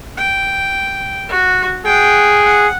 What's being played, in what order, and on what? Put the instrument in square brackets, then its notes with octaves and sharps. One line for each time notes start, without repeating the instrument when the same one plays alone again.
[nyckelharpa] G5
F#4
[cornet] G#4 [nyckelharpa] F#5 G5
[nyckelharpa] F#5